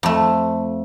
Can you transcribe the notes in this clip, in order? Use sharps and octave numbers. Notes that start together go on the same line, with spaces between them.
F2 A3